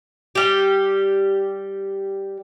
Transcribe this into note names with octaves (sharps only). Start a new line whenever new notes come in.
G3 G4